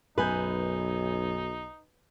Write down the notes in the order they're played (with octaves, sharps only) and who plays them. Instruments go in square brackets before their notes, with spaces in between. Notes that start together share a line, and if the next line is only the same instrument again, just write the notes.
[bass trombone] B1 [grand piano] F#2 G#5 G6 [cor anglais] D#4 [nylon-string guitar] B4